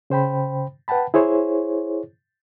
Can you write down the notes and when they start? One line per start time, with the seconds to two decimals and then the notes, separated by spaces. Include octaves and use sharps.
0.10 C#3 C5 G5 B5
0.88 B4 F#5 G5 A5 B5
1.14 E4 G#4 C5 C#5